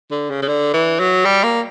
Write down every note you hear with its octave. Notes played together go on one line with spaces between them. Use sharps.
D3
C#3
C#3
D3
E3
F#3
G3
A#3